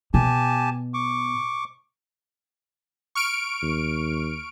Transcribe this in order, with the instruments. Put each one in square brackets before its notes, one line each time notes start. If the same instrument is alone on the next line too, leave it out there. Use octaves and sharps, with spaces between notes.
[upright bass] B2 [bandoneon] G4 G#5 A5
[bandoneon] C#6 D6
[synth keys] C#6 F6 D7
[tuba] D#2